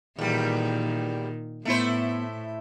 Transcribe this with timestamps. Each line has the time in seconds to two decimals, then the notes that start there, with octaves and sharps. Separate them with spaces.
0.19 E2 A#2 D#3 G3
1.65 A2 A3 B3 E4 C5